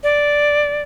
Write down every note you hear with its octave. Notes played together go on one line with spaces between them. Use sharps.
D5